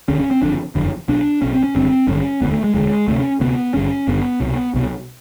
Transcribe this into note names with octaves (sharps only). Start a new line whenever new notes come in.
E1 D#2 D3 C#4
C#4
C4
F#1 F2 D3 D4
F#1 F2 D3
B1 B2 D4
B1 B2 C#4
C4
C#4
G#1 G2 D3 C4
G#1 G2 D3 C#4
E1 D2 D3 B3
A3
G#3
E1 D2 D3 G#3
D2 C3 A3
C#4
D2 C3 B3
G#1 G2 D3 C#4
G#1 G2 D3 B3
C2 B2
C2 B2